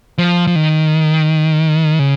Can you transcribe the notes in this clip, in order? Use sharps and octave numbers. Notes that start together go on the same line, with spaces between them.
F3
F3
D#3
C#3